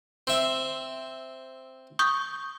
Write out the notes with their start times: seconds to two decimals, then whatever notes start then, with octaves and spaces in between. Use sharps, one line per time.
0.27 C4 E5
1.99 C#6 D#6 G6